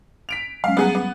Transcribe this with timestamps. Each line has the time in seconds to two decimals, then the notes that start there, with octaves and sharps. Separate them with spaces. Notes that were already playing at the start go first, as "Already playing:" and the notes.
0.29 B6 D7 F7
0.64 F#3 G#3 C#4 F5
0.77 F#3 G3 B3 G#4 F#5 A#5
0.95 B3